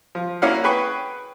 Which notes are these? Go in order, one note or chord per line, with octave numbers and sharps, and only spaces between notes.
F3
A#3 C#4 E4 F#4 F5 F#5
G#4 B4 G5 B5 C#6